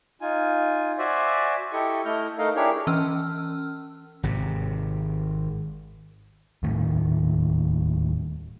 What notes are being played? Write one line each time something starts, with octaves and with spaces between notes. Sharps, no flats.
D#4 F4 G#5
F#4 C5 D5 E5 G#5
E4 G4 A4 D#5 C#6
A3 E4 D#5 F6 G6
A3 D#4 A4 A#4 D#5 F5
D4 E4 G4 G#4 A#4 C#5
E3 C#4 E6 F6
G#1 C3
D#1 A2 D#3 A3